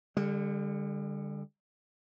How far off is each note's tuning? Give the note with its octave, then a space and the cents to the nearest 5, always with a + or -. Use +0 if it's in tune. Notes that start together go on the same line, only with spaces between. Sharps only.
D3 +0 G3 +40